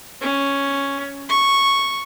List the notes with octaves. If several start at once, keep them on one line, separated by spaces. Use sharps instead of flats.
C#4
C#6